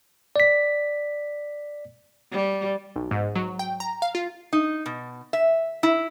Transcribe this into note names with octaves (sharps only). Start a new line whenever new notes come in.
D5 B6
G3
B1
G#2
F#3
G5
A#5
F5
F4
D#4
B2
E5
E4